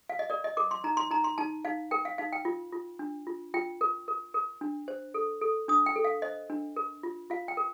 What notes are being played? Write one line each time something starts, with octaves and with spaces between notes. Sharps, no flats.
F5
D#5
A#4 D5
D#5
A#4 D6
C6
D#4 A#5
C6
D#4 A#5
C6
D#4 A5
D#4 F5
A#4 G5
F5
D#4 F5
G5
F4
F4
D4
F4
F4 G5
A#4
A#4
A#4
D4
C5
A4
A4
D4 D#6
G5
A4
F5
C5 D#5
D4
A#4
F4
F4 F5
G5
A#4